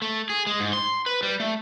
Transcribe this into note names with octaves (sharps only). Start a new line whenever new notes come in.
A3
G#4
G#3
G#2
C6
B4
G3
A3